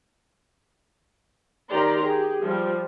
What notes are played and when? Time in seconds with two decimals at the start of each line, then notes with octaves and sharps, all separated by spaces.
1.70 D#3 G4 D5 A#5 C6
2.01 G4 G#4
2.42 F3 G3